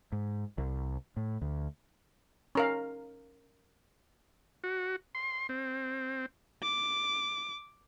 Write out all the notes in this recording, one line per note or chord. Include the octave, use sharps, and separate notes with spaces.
G#2
C2
A2
D2
C#4 A#4 F5
F#4
C6
C4
D6